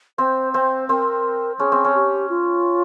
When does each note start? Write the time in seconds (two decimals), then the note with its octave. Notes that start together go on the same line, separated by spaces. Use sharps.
0.18 C4 C5
0.53 C4 C5
0.89 C4 A#4
1.59 C#4 G#4
1.72 C4
1.84 C#4
1.95 G4
2.30 F4